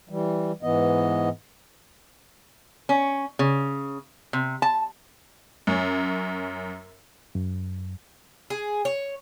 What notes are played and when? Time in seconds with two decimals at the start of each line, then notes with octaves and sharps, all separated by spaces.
0.09 E3 G3
0.63 G#2 E3 B3 D#5
2.89 C#4
3.39 C#3
4.33 C3
4.62 A5
5.67 F#2 C#4
7.35 F#2
8.50 G#4
8.85 C#5